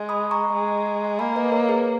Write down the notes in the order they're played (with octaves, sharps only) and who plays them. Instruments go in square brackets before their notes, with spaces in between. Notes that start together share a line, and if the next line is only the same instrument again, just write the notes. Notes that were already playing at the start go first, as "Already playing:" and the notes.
Already playing: [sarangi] G#3
[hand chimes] B5 D#6
A#5 C#6
[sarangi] G#3
[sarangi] A#3 [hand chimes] G#5 B5
[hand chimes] B4 D#5
A#4 C#5
G#4 B4